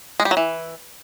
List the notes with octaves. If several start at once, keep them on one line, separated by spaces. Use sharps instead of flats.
G#3
G3
F#3
E3